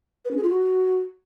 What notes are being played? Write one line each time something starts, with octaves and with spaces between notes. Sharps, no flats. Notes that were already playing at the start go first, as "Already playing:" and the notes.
B4
C#4
G#4
F4
F#4